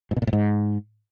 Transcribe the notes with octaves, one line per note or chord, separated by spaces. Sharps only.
G#2
B2
A#2
A2
G#2